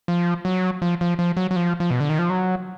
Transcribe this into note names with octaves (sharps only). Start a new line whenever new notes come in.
F3
F#3
F3
F3
F3
F#3
F#3
F3
F3
B2
D3
D#3
F3
F#3